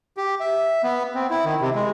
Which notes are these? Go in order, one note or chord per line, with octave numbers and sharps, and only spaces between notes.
G4
E5
B3
C4
E4
D#3
C3
G#3